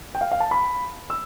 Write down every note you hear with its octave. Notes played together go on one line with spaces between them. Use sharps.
G5
F5
F5
A5
B5
E6